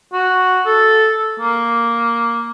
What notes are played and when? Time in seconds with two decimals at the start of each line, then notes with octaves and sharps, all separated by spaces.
0.13 F#4
0.66 A4
1.40 A#3